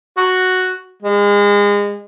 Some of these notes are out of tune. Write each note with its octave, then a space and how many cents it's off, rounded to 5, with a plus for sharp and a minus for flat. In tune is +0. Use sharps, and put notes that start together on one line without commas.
F#4 +0
G#3 -30